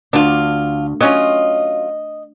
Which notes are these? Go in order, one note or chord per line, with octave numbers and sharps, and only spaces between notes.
D2 D4 F4
F#3 C#4 F4 D#5